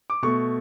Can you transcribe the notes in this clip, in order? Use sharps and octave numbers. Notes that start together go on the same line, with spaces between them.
D6
B2 A3 C#6